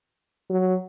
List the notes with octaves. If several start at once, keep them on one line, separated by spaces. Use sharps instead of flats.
F#3